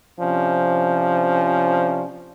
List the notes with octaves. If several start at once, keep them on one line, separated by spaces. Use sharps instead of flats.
C3 F3 C#4 D4